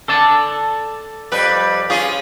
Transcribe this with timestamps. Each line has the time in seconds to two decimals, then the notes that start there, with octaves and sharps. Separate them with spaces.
0.08 A4 D5 A5
1.32 F2 G3 B4
1.90 C#4 F4 G#4